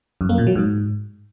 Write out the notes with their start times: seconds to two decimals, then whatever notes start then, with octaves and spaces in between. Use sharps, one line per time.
0.21 F#2
0.29 A#3
0.38 A#2
0.47 F#3
0.55 G#2